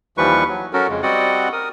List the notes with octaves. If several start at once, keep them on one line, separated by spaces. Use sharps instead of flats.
D#2 E3 F3 G3 B4 C#6
F#3
F#3 C#4 F#4 A4 A#4
F2 C#3 G#3
G3 C4 F#4 D5 D#5 F#5
A#4 D#6